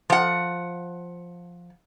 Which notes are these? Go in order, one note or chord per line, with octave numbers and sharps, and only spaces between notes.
F3 F#5